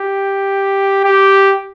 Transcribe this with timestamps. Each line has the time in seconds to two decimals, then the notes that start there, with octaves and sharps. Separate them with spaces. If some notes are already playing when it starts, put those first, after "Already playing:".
Already playing: G4
1.04 G4